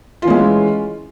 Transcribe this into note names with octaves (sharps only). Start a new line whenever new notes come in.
E3 G#3 C#4 F4